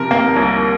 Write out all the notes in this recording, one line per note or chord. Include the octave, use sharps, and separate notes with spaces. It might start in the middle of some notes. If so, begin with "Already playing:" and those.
Already playing: C3 F3 A#4
A#3
C2